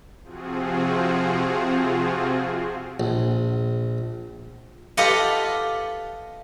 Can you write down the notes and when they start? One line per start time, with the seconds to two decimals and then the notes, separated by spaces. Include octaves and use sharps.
0.24 C3 F3 C4 F4 F#4 G#4
3.00 A#1
4.97 F4 G4 A4 B4 D#5 F#5